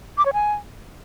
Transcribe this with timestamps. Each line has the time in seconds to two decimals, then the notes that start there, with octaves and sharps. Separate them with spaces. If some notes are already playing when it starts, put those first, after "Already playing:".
0.18 D6
0.26 C#5
0.33 G#5